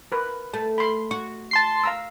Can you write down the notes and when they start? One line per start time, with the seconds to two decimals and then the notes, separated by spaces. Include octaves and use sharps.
0.12 A#4 B4
0.54 A3 A5
0.78 B5 C6
1.11 F#4 C#6
1.51 A5 C6 C7
1.84 F5 A#5 E6